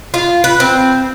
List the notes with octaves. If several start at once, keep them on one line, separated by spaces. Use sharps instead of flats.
F4
B4
C4